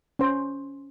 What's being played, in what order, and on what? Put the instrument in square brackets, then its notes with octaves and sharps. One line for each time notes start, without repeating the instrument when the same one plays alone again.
[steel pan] C#4 C5